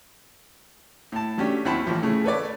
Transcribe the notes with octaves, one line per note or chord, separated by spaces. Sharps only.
A2 A5
F#3 A3 C#4 D4 G4
D#2 C4 E4 F#5 A5 B5
A1 F3
A2 C#3 A3
A4 B4 C#5 D5